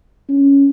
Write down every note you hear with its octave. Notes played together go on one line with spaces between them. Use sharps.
C#4